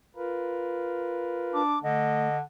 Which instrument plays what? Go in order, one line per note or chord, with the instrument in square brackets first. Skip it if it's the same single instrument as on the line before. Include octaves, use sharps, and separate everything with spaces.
[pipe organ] F4 A#4 B4
[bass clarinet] D4 [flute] D6
[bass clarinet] D3 [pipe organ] A3 [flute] D#5